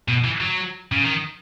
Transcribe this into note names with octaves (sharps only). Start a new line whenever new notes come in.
B2
E3
F#3
C#3
D#3